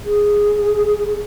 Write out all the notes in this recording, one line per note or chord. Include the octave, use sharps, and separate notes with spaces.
G#4